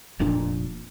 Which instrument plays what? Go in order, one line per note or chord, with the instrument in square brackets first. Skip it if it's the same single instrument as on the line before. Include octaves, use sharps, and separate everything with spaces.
[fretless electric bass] F1 F2 A#2 D4